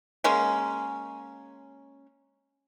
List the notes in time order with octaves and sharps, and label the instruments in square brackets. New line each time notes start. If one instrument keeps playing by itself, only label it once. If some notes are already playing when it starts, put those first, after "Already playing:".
[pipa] G#3 A#3 C#4